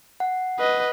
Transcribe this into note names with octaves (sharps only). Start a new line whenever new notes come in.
F#5
B4 D#5